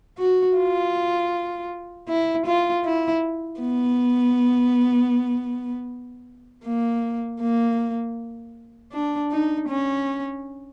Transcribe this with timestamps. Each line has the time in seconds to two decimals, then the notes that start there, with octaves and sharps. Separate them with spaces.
0.18 F#4
0.57 F4
2.08 E4
2.46 F4
2.84 E4
3.60 B3
6.64 A#3
7.41 A#3
8.92 D4
9.31 D#4
9.69 C#4